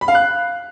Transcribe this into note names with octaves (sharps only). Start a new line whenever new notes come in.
B5
F5
F#6